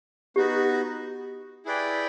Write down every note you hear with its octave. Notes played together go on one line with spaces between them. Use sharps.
B3 D#4 F#4 G4
E4 G#4 B4 D5 G5